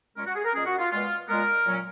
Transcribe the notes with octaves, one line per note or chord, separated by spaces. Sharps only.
A#2 G#3 C#4 A#4
F#4
G#4
A#4
A#2 G#3 C#4 G#4
F#4
F4
A#2 G#3 B3 F4
A#2 G#3 B3 A#4
A#2 F#3 C#4